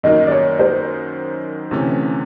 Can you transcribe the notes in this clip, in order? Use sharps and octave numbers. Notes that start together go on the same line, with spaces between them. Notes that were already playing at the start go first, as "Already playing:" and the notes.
F#2 D#3 F#3 A#3 D#4 D#5
D5
C#5
C5
D2 C3 E3 A3 C#4